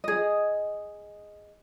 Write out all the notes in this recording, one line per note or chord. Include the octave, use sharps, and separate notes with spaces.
G#4 D#5